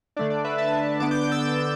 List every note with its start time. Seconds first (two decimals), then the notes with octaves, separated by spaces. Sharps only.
0.17 D3 A3 D4 D5
0.30 D5
0.44 B4 E5
0.58 E5 A5
1.00 D3 B3 D4 A5 D6
1.11 D6 G6
1.22 D6 G6
1.32 E6 A6
1.42 D6 G6